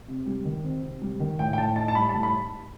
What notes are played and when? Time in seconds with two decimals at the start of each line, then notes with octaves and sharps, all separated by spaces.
0.08 C3
0.26 G3
0.45 D#3
0.64 C4
0.83 C3
1.02 G3
1.20 D#3
1.39 A2 G5
1.53 G5
1.58 A2 A5
1.76 D#4 A5
1.88 A5
1.95 G3 B5
2.09 A5
2.14 A2
2.23 B5